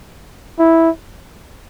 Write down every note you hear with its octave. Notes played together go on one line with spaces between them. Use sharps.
E4